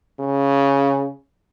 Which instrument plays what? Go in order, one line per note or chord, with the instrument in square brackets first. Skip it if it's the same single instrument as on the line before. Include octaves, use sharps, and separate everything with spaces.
[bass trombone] C#3